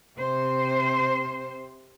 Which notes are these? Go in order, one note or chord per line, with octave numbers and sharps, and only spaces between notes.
C3 C5